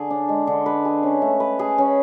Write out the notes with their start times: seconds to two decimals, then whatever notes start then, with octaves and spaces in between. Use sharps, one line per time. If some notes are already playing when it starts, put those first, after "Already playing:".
Already playing: D3 G#4
0.10 D4
0.29 G#3
0.47 D3
0.66 B4
0.85 G#4
1.03 C#4
1.22 A3
1.40 B4
1.59 G#4
1.78 C#4